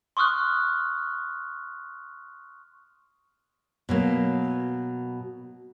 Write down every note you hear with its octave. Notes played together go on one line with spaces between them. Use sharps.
C6 C#6 D#6 F6 F#6
B2 F#3 A#3